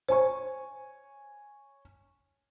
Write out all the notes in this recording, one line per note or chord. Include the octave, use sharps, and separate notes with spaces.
C5 C#5 G#5 C#6